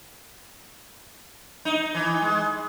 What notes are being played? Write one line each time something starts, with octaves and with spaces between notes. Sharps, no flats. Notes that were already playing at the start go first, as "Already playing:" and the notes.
D#4
E3
G#3